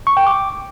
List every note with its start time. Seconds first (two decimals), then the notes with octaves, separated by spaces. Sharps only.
0.07 C#6
0.17 G5
0.27 D6